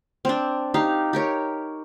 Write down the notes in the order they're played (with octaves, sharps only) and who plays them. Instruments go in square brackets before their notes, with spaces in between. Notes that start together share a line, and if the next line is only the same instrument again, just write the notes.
[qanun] C4 D4
D#4 G4 F5
G4 A#4 C#5